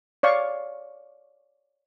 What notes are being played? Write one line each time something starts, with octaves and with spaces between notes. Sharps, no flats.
C#5 D5 F5 C#6